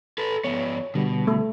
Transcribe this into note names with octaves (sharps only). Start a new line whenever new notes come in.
A4 B4
F3 B3 C#5
B2 D3 G3
A3